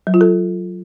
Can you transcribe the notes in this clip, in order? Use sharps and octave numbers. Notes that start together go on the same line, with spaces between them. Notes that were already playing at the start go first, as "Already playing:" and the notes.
F#3
F4
A4